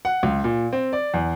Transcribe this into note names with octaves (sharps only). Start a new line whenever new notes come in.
F#5
C#2
A#2
C4
D5
E2